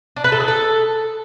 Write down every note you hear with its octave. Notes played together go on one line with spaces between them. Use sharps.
D4
B4
A4
G#4
A4